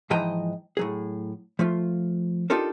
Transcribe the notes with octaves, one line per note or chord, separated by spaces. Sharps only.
G#2 E3 F3 D#5 G5 A#5
A2 F#3 G#4
F3 A3 F4
D4 D#4 F4 G4 A4 A#4